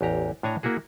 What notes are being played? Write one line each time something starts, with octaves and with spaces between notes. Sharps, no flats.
A1 E2 G4 A#5
A2 D4 C#5 G#5 A#5
A#3 E4 F#4 G#4